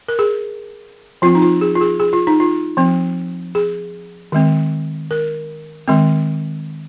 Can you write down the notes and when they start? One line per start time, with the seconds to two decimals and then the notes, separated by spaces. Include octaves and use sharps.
0.08 A#4
0.19 G#4
1.22 F3 C4 F4
1.35 D#4
1.42 F4
1.61 G#4
1.75 F4
1.81 G#4
2.00 G#4
2.13 F4
2.27 D#4
2.40 F4
2.77 F3 C4
3.55 G#4
4.32 D#3 G#3 C4
5.11 A#4
5.88 D#3 G#3 C4